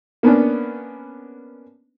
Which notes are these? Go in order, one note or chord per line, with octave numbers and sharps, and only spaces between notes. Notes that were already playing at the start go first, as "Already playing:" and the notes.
A#3 B3 C#4 D4